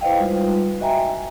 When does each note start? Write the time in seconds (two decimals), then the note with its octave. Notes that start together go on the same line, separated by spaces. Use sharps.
0.01 E4 B4 C5 D#5 F5 G5
0.18 G3 G#3 D#4 F4 B4
0.81 F#4 D#5 E5 G5 G#5 A#5